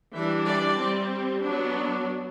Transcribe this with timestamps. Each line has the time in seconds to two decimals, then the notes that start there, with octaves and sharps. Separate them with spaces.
0.14 E3 G3 D4 E5
0.46 D5
0.79 G3 C4
1.42 F#3 B3 D4